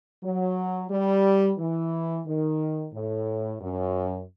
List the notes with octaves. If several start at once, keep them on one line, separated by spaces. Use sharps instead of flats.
F#3
G3
E3
D#3
A2
F#2